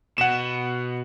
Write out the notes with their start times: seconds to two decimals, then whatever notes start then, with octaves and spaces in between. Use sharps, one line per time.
0.18 B2 F#5 E7